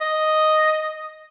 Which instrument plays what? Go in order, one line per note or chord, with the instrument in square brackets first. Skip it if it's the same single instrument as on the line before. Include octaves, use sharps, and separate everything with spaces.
[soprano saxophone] D#5